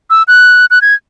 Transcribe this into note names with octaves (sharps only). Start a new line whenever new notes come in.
E6
F#6
F#6
G#6